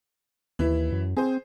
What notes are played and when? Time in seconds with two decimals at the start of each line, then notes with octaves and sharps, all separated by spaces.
0.59 D#2 E3 E4
0.92 F#2
1.17 C4 G#4 C5